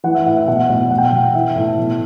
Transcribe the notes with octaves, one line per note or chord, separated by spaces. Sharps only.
E3 F#5
E5
A2 F#5
F#5
B2 F#5
B2
B2 F#5
G5
F#5
B2
E3 E5
A2
B2